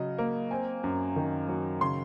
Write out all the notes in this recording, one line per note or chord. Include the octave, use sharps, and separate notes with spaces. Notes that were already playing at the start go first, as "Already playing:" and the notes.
Already playing: C#3 F#3 D#5
A#3
C4 G#5
F#2
D#3
F#3
C#3 C6